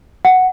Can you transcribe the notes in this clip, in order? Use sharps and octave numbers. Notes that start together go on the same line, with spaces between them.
F#5